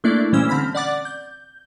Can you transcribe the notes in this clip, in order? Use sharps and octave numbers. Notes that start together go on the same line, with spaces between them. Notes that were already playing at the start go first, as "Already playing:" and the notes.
A3 A#3 D4 E4 D5
A#2 E3 G3 C#4 C5 E6
D3 C4 B5 F6 B6
D5 F#5 D6 A6
G6